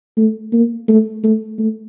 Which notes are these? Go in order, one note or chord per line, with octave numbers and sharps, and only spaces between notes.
A3
A#3
A3
A3
A3